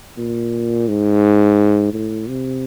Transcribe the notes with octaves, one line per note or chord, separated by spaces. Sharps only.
A#2
G#2
A2
C3